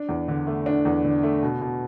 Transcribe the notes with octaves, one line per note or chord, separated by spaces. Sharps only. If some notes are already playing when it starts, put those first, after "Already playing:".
Already playing: D4
E2
D3
A3
D4
E2
D3
A3
B2
B2